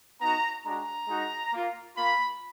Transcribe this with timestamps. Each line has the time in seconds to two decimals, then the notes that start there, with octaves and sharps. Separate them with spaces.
0.19 B3 D#4 F#4 A#5
0.63 G#3 D4 F#4 A#5
1.07 G#3 D#4 F#4
1.51 A#3 F4
1.95 A#3 F4 B5